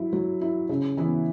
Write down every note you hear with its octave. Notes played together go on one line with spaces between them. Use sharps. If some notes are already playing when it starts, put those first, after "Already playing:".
Already playing: F#3 E4
F#3
E4
C#3
E3 B3 E4